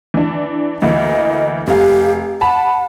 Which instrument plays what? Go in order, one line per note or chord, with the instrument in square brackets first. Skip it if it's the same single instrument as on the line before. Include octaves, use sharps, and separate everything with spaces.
[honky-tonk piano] E3 D4
[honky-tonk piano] D2 E3 A#3 [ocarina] D#5
[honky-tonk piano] F1 F5 [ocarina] G4
[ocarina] F#5 [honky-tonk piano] A5 B5